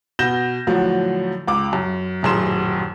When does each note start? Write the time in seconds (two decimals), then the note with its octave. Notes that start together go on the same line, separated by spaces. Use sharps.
0.19 B2 G6 A#6 E7 G7
0.67 A2 D3 F3 F#3
1.48 C#2 D6
1.73 F#2
2.23 D#1 A1 F#2 G#4 C6 E7